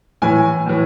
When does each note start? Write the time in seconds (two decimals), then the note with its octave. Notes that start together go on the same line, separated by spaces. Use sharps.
0.22 A2 E3 G#5
0.66 A2 E3